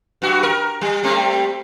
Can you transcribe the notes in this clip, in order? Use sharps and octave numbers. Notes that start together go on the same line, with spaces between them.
G2 F#4
A#4
G3
G3 A3 C4